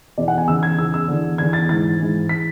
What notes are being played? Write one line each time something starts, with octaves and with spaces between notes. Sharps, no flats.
E2 B2 D5
F#5
G#5
E2 C#3 E3 E6
G#6
E2 C#3 E3 E6
E6
E2 D3
E2 D3 G#6
A6
G#2 E3 A6
G#2 E3
E3 B6